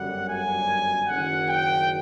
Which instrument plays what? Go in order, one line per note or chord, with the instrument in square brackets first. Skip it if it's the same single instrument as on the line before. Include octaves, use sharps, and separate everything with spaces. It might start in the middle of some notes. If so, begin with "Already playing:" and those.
Already playing: [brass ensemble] G1 F#2 D3 G3 F#5
G#5
F#1 F#2 D#3 F#5
G5